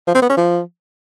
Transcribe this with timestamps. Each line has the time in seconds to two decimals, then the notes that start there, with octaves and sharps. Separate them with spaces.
0.07 F3
0.14 C4
0.22 B3
0.29 C#4
0.37 F3